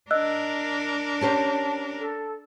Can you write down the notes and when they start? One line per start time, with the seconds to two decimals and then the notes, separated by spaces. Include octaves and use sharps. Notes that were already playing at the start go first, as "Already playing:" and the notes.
0.11 D4 A#4 D#5 E6 F#6
1.21 C#4 G4 C5 A5
1.99 A4